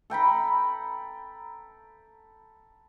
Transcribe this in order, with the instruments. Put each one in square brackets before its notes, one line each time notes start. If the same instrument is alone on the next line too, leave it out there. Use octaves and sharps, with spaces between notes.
[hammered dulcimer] A4 G5 A#5 B5